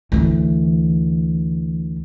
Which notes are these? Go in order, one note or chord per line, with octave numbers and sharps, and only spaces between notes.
D2 E3